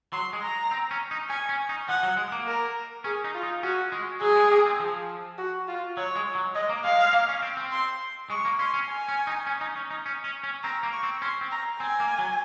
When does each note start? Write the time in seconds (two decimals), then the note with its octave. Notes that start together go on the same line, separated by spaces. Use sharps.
0.13 F#3 C6
0.33 G#3
0.42 A#5
0.71 C4
0.91 C#4
1.11 D#4
1.29 C#4 G#5
1.49 C#4
1.69 D#4
1.88 F3 F#5
2.03 F#3
2.17 G#3
2.32 A#3
2.47 A#4
3.04 C#4 G#4
3.24 D#4
3.35 F4
3.43 D#4
3.63 C#4 F#4
3.92 G#3
4.21 F#3 G#4
4.36 G#3
4.51 A#3
4.66 C4
4.80 F3
5.38 F#4
5.68 F4
5.97 F#3 C#5
6.16 G#3
6.35 F#3
6.55 G#3 D#5
6.69 A#3
6.84 G#3 F5
6.99 G#3
7.13 A#3
7.29 C#4
7.42 C4
7.57 C4
7.71 C6
8.30 G#3 C#6
8.45 A#3
8.59 C#4 C6
8.74 C#4
8.88 G#5
9.09 C#4
9.27 D#4
9.47 C#4
9.61 D#4
9.76 C#4
9.91 D#4
10.06 C#4
10.24 C#4
10.43 C#4
10.63 C4 A#5
10.83 A#3
10.92 C#6
11.03 C4
11.22 C#4 C6
11.41 C4
11.51 A#5
11.80 C4 G#5
12.00 A#3
12.19 F#3